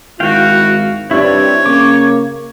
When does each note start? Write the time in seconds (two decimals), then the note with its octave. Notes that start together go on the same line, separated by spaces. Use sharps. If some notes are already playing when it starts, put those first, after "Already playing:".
0.20 G#1 E4 F#4 F5 G5
1.11 G2 G3 C4 D4 E4 C#5
1.66 C#3 A#3 D6